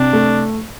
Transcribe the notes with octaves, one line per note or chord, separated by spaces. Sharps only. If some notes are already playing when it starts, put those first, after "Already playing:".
Already playing: C3 D4
A3